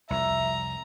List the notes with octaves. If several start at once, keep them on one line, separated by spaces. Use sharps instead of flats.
C2 F2 E5 A#5